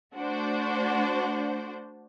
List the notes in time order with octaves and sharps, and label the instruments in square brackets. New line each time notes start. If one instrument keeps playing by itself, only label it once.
[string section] A3 D4 F#4 C5